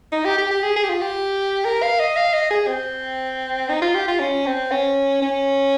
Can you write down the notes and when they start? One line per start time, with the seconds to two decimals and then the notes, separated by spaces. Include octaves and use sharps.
0.12 D#4
0.25 G4
0.38 G4
0.51 G4
0.63 G#4
0.76 G#4
0.84 G4
0.89 F4
1.02 G4
1.65 A#4
1.83 F5
2.00 D#5
2.17 F5
2.33 D#5
2.51 G#4
2.67 C4
3.69 D#4
3.82 F4
3.95 G4
4.07 F4
4.20 C#4
4.46 C4
4.71 C#4
5.22 C#4